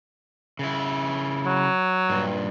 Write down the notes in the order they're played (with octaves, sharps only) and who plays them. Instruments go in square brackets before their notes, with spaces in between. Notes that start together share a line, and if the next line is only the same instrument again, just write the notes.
[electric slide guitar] C#3 E4
[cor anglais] F#3
[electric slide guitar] G2 A#2